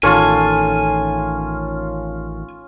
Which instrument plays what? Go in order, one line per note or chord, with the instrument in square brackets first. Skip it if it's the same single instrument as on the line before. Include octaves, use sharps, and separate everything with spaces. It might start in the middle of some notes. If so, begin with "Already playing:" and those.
[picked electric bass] A1 D#3 [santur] C#4 F4 [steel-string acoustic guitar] A4 [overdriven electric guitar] G#5